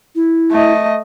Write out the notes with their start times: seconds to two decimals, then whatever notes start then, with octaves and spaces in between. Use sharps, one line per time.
0.15 E4
0.51 A3 D#5